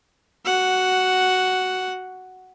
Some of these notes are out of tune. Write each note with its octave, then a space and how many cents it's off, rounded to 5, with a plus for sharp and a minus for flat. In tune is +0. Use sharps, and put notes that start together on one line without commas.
F#4 +10 F#5 +0